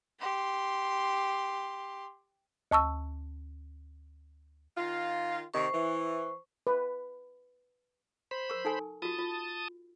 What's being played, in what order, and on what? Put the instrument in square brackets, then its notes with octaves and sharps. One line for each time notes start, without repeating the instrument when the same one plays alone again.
[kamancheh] G4 C6
[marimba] D2 A5 C#6 E6
[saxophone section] D#3 F4
[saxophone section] C3 D#3 [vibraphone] C5 C#6
[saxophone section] E3
[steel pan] B4
[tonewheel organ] C5 B5
[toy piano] A#4 C#6
D#4 A4 G#5
[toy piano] F4 F#4 [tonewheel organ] A5 D#6
[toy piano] F4